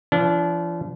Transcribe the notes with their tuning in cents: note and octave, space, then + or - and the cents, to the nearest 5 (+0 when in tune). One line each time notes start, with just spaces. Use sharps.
F3 -45 D4 -30